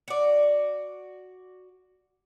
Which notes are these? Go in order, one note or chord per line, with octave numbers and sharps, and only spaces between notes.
F#4 D5